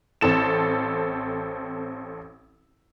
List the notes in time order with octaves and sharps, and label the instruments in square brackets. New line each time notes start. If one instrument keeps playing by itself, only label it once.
[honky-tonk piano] A1 C4 A4 E7